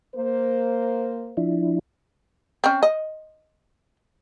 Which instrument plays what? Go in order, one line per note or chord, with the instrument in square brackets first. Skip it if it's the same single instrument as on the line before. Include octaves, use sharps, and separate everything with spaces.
[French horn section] A#3 C5
[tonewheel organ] F3 D4 E4
[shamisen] C4 C#4
D#5